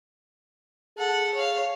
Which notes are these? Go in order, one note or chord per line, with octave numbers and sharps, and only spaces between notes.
G#4 A4 F#5
C#5 F5